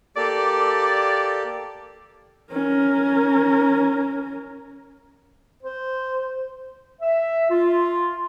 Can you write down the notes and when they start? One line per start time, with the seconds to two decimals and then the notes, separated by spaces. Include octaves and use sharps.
0.17 A#3 G4 A4 D5
2.52 C#4 A#4
5.63 C5
7.01 E5
7.50 F4